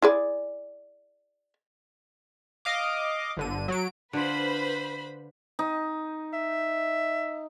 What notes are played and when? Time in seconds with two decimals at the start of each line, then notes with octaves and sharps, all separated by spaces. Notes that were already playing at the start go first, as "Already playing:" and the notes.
0.02 E4 G#4 D5
2.65 D#5 F5 D6
3.37 G1 D3 D#7
3.68 F#3 D7
4.13 D3 F4 B4 C5 B5
5.59 D#4
6.33 E5